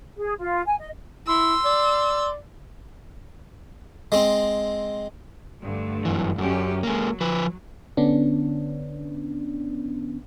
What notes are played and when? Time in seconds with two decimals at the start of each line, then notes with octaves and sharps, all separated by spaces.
0.18 G#4
0.39 F4
0.66 G#5
0.80 D#5
1.28 E4 C6 E6
1.65 D5
4.12 G#3 C4
5.63 G2 D3 A3
6.05 F#2 E3
6.38 F#2 D3 C#4 G4
6.83 F#3 G#3 A#3
7.21 F3 B4
7.97 D3 B3 C#4 D4